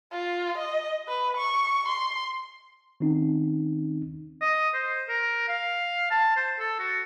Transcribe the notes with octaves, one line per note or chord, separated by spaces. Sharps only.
F4
D#5
B4
C#6
C6
D#3 C4 C#4 D#4
D#5
C5
A#4
F5
A5
C5
A4
F#4